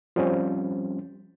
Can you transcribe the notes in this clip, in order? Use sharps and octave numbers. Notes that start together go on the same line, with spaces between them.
F3 G3 C4 C#4